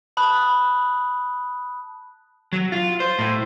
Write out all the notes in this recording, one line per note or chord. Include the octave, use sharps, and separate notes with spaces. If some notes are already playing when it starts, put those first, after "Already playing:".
A5 B5 D#6 F#6
F#3
F4
C5
A2